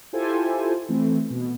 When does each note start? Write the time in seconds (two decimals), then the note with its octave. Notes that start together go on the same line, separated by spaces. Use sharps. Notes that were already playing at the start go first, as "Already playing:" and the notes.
0.13 E4 F4 G4 A4 C5 G#5
0.89 E3 A3 C4
1.30 B2